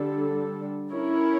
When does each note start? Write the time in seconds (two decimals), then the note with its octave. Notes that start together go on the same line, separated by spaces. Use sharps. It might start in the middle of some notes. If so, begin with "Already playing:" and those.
Already playing: D3 G3 D4 A4
0.92 C#4 E4 A#4 C#5